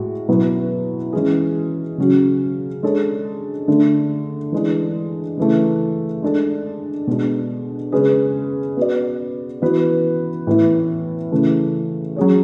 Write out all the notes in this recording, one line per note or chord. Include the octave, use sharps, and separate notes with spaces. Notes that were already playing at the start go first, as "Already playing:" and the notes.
Already playing: A2 G#3 F#4
B2 F#3 B3 E4 B4
E3 G#3 C#4 G#4
C#3 F#3 C#4 F#4
G#3 D4 A4 C#5
D3 A3 D4 A4
E3 G#3 D4
C#3 E3 A3
G#3 D4 A4
B2 G#3 D4
C#3 G#3 C#4 G#4 B4
B3 F#4 B4 D5
E3 B3 F#4 B4
A2 E3 B3 E4
C#3 E3 A3
F#3 C#4 G#4 C#5